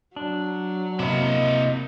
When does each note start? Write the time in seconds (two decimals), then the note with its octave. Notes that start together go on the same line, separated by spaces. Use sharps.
0.16 F#3 D4
1.00 C3 A#3 E4 D#5